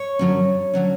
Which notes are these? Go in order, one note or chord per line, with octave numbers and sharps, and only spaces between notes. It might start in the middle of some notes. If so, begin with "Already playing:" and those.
Already playing: C#5
F#2 D3 F#3 C#4
D3 F#3 C#4